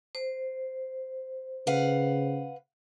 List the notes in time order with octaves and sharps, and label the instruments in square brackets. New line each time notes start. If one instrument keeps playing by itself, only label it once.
[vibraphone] C5
[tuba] C#3 [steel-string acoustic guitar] B4 F5 F#5